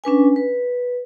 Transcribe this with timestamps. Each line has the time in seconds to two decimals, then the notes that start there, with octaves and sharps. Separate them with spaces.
0.04 C#4 D4 B4 G#5
0.36 B4